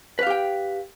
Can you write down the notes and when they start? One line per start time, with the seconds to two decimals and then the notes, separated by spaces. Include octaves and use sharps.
0.19 B4
0.23 F5
0.27 G4
0.30 G5